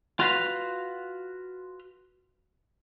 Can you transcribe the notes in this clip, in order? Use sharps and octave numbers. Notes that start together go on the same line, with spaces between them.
F4 F#4 B4 F5